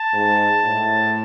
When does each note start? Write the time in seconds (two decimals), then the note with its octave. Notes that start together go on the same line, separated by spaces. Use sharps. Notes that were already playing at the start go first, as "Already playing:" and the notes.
Already playing: A5
0.14 G#2
0.65 A2